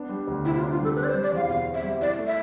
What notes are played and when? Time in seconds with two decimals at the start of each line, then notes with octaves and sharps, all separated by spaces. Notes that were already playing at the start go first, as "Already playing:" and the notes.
Already playing: B3 D4
0.09 G3
0.27 D2
0.45 C3 E4
0.57 F4
0.61 D4
0.71 F4
0.79 G3 A4
0.96 C4 B4
1.04 D5
1.09 C5
1.14 G3
1.23 D5
1.32 E2 F5
1.49 B2 F5
1.66 C4
1.75 E5
1.83 G3
2.01 E4 D5
2.19 A3
2.27 E5